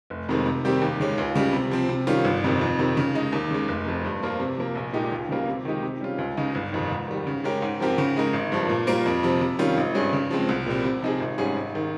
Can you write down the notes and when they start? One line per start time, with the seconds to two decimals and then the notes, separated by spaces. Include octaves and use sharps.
0.10 F1
0.28 F2 C3 D#3 G#3
0.46 C3
0.65 D#3 G3 C4 G4
0.82 D#2
1.00 C#3 G#3 C#4
1.18 C#2
1.35 C#3 G3
1.53 C3
1.71 F3 C4
1.89 C3
2.07 D#3 G3 C#4 F4
2.25 G1
2.44 F2 C3 D#3
2.61 F2
2.79 C3 D#3
2.97 C#3
3.14 G#3 D#4
3.33 D#2
3.51 C#3 G#3
3.68 F1
3.86 F2 C3
4.05 G2
4.23 F3 A#3 F4
4.40 C3
4.58 F3 A#3
4.75 A#1
4.93 A#2 G#3 D#4 G4
5.12 C#2
5.29 C#3 G3 A#3 F4
5.48 C3
5.65 D#3 G#3 D#4 G4
5.83 C3
6.01 G3 C#4 F4
6.18 C#2
6.37 C#3 G#3 D#4
6.55 G1
6.72 F2 C3 D#3
6.90 G#2
7.08 D#3 G3
7.27 C#3
7.44 G#3 C#4 G4 A#4
7.62 G#2
7.80 F3 C4 G4 A#4
7.98 C#3
8.16 G#3 D#4 A#4
8.33 G#1
8.52 G2 F3
8.69 A#2
8.87 G3 A#3 F4 A#4
9.06 F2
9.23 C3 F3
9.41 C3
9.59 D#3 G3 C#4 F4
9.77 G#1
9.95 G2 G3 C#4 G#4
10.13 C#3
10.31 F3 G#3 C4
10.49 C2
10.66 A#2 G3 C4
10.84 C3
11.02 F3 C4 D#4 G#4
11.20 G#1
11.38 G#2 G3 C#4 G#4
11.57 G#1
11.75 D#3